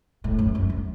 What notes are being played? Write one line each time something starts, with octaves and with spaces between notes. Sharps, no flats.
A2
F#2
F#2
F#2